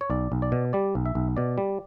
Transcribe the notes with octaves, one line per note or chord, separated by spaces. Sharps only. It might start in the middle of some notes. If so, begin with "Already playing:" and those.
C#5
B1 D5
B1
D5
B2
G3 D5
B1
E5
B1
B2 D5
G3